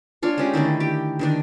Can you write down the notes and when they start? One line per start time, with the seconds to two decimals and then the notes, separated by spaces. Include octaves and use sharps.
0.23 D4 F4 C#5
0.38 G#3 C#4 G4
0.54 D3 D#3 A3 E4
0.80 G4
1.19 D3 D#3 D4